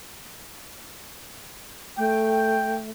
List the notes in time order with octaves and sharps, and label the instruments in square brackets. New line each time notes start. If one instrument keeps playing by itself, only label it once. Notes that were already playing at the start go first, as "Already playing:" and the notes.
[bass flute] A3 [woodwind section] G5